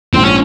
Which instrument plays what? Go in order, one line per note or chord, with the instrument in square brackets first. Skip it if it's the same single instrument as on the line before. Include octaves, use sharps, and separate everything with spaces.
[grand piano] A#1 G#2 F3 [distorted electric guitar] C4
[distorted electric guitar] C#4